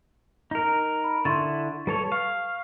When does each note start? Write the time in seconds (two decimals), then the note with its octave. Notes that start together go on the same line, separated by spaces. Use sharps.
0.51 D#4 A#4
1.04 B5
1.25 D3 E4 C6 C#6 A6
1.87 G3 A4 B4 C#5 A5
2.12 F5 C#6